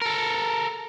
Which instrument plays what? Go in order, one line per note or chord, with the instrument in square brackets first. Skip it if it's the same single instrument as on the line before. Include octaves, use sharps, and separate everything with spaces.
[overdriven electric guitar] A4 A#4